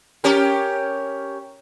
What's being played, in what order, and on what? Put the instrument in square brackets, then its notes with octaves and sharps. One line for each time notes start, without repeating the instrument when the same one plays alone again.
[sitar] C#4 G4 A#4